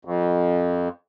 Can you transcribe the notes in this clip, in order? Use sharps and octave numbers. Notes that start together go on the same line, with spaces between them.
F2